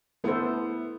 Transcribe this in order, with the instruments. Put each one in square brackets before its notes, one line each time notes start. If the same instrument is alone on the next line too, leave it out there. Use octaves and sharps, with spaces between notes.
[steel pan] A3 E4 A4 C5 [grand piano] B3